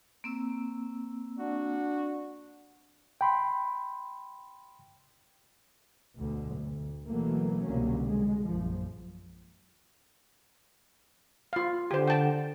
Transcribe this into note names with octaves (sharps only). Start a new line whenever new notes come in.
A#3 C4 E6
D4 F#4
G5 B5 C6
D2 B2 D3
D2
B2 E3 F#3 A3 A#3
C2 B2 D3 F#3 A#3 C#4
G#3
A#1 F#2 F3
F4 F5
D3 G4 C5
G5 A5